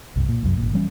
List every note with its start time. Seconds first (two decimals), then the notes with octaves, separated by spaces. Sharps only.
0.15 F1 C2 G2
0.29 A#2
0.43 C2 F#2
0.57 G#1 A#2
0.73 E3 G3 A3 C#4